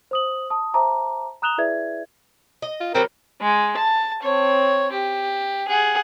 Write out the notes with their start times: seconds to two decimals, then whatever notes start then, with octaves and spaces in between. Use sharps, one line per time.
0.11 C5 D#6 F#7
0.50 A5 D#6
0.74 C5 E5 A5 A#5 D6
1.42 A#5 D#6 F#6 E7 F7 G7
1.58 E4 G#4 B4 D5 E5 G#6
2.62 D#5
2.80 F4
2.94 D3 F#3 G3 C4 A#4
3.42 G#3
3.77 A5
4.22 C4 C#5
4.92 G4
5.68 G#4 F#5